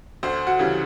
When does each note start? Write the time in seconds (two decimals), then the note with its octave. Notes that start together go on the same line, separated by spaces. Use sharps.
0.23 D2 C5
0.47 F#4
0.59 C#3 E3 G3